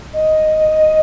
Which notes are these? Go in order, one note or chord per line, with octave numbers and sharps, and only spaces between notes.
D#5